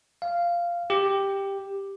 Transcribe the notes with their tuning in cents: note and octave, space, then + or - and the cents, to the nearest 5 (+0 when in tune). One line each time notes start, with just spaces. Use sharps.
F5 -10
G4 +5